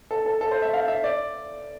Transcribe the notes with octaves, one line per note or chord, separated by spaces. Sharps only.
A4
A4
A4
C5
E5
F5
E5
D5